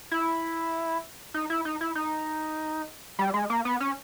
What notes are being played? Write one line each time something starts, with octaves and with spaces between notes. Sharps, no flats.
E4
D#4
E4
D#4
E4
D#4
G3
G#3
A#3
B3
C#4